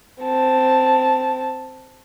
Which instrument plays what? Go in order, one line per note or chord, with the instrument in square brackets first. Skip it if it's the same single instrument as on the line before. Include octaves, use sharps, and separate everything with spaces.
[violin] C4 A5